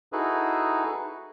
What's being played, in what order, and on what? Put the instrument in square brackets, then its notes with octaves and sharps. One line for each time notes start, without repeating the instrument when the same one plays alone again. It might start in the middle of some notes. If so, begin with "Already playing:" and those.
[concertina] D#4 E4 F#4 G#4 A4 B4